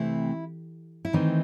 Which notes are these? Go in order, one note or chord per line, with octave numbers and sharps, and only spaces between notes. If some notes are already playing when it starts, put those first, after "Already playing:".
Already playing: C3 E3 A3 C4 E4
E4
D#3 E3 A3 C4 D#4